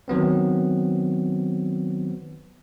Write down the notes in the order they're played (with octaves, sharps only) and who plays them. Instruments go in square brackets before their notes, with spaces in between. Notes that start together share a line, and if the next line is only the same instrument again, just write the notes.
[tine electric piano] D#3 F#3 B3 C4